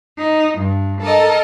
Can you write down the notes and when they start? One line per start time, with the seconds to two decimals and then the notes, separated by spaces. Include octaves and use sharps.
0.18 D#4
0.58 G2
1.01 A4 A#4 D#5